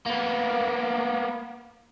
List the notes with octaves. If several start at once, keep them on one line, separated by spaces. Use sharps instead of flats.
A#3 B3